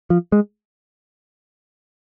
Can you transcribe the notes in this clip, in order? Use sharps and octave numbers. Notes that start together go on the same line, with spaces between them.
F3
G#3